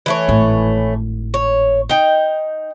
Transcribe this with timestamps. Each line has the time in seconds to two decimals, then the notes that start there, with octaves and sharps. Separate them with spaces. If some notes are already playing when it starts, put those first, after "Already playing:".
0.06 E3 A3 C#5
0.28 G#1 A2
1.34 C#5
1.90 D#4 G5